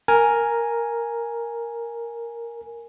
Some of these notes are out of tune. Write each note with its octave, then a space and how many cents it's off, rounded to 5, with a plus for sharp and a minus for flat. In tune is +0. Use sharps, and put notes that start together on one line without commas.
A#4 +0 G#5 +0